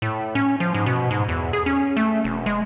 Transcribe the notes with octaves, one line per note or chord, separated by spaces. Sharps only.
A2
C#4
F3
G#2
B2
G#2
E2
G#4
C#4
A3
E1
G#3